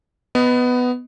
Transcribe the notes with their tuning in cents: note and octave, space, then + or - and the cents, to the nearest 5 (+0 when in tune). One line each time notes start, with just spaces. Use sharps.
B3 +10 D#5 +5